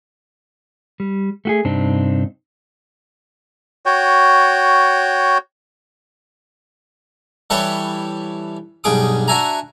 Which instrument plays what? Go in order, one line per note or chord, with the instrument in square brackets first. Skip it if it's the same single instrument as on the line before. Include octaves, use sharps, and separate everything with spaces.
[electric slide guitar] G3
A3 F#4 G#4
G2 C3 C4 D4 D#4
[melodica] F#4 C#5 G5
[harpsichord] E3 G3 A4 B4 C#5 A5
B1 G2 G#4 D6 D#6
D4 F#4 E5 G#5 A#5